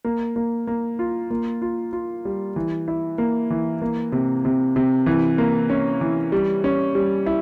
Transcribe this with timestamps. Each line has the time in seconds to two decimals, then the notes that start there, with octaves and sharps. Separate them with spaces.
0.05 A#3
0.36 A#3
0.67 A#3
0.99 F4
1.31 A#3
1.62 F4
1.93 F4
2.25 G3
2.56 E3
2.88 E4
3.18 A#3
3.50 E3
3.82 A#3
4.12 C3
4.45 C3
4.76 C3
5.06 E3
5.38 A#3
5.70 C#4
6.01 E3
6.32 G3
6.64 C#4
6.95 G3
7.26 E4